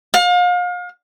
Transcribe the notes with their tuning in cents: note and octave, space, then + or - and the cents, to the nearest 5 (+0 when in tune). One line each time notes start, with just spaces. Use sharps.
F5 +35